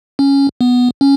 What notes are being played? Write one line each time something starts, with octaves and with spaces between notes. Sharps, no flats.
C#4
B3
C#4